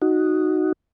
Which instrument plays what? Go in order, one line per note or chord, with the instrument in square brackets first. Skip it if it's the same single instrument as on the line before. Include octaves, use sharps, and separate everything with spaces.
[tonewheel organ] D#4 F#4